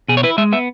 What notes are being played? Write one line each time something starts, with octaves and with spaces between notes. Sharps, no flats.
B2 G#4
C#5
E4 B4
G#3 E5
B3 E5